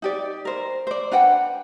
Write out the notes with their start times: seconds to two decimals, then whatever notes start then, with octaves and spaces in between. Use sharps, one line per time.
0.02 D#4 G4 D5
0.45 A#4 C5
0.87 C5 D5
1.12 D4 B4 F#5 G5